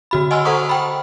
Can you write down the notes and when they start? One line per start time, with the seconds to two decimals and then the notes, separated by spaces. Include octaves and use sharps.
0.11 D3 F#4 B5
0.31 D#5 F#5 G#5 C6 E6 F6
0.45 A4 C5 F#5 A#5 C#6 D#6
0.69 G5 B5